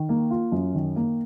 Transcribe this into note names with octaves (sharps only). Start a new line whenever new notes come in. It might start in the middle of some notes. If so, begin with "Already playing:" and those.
Already playing: D#3
A#3
F4
F#2
D#3
A#3